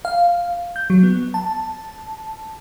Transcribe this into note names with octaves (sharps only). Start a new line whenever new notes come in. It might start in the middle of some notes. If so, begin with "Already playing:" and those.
F5
G6
F#3
B3
A5